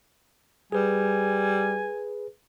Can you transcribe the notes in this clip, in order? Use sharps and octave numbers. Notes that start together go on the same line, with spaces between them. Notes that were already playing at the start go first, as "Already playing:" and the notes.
G3 G#4 B4 G#5